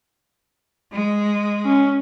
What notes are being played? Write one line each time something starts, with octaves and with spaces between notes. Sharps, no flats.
G#3
C#4